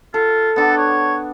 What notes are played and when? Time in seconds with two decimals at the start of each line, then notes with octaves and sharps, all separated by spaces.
0.14 F4 A4
0.56 B3 D4 A4 D6
0.77 C#5